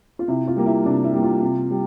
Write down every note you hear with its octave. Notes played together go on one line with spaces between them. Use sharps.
F4
C3 E4
F4
G3 A#3
E4
C3 D4
E4
G3 A#3
F4
C3
G3